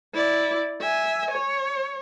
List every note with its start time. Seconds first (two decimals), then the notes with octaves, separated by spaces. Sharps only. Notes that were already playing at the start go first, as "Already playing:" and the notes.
0.14 E4 D5
0.81 E5 G#5
1.31 C#5